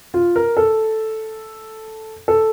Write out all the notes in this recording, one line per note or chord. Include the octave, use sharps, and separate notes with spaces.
F4
A#4
A4
A4